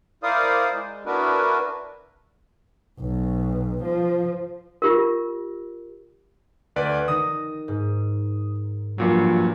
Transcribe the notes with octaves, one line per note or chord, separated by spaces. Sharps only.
E4 A#4 C5 D5 F5 D#6
G#3
B3 D4 E4 F#4 A#4 B4
B1
F3
F4 G4 A#4
D2 B4 D5
D#3 D#4 D#6 A#6
G#2
G2 A#2 F3 F#3